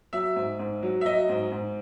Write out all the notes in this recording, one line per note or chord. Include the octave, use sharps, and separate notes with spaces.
F#3 E5
G#2
G#2
F#3
E5
F#3 D#5
G#2
G#2